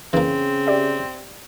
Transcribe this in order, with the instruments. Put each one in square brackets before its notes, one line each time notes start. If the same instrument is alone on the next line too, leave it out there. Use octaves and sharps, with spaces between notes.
[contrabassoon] C#3 [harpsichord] E3 A#3 [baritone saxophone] C4
[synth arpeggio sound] G4 D5 E5